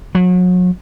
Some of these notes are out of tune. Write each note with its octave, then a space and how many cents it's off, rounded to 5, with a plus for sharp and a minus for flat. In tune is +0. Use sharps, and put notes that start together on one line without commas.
F#3 -35